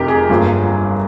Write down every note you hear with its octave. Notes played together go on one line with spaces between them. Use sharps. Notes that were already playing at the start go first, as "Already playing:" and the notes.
Already playing: F1 F2 C3 G4 A#4
G#4
G1 G2 F3 A#3